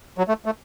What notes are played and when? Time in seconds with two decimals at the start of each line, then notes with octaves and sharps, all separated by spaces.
0.18 F#3
0.28 A3
0.46 A3